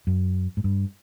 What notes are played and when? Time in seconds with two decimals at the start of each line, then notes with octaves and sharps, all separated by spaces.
0.07 F#2
0.57 G#2
0.64 G2